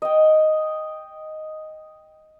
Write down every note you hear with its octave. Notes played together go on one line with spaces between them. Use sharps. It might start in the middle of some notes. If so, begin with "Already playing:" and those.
D#5 G5